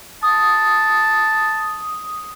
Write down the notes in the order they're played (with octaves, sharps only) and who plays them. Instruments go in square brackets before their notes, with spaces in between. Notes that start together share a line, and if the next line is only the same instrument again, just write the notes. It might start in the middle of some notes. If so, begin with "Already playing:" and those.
[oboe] A5 [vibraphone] D#6